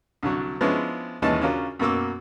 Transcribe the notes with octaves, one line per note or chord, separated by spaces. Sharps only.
C2 D3 F#3
F3 G#3 B3 C#4 D4 E4
D#2 E3 G#3 C#4 D#5 A5
C#3 C#4 D4 F4 F#4 A#4
F#2 B2 A#3 D6 E6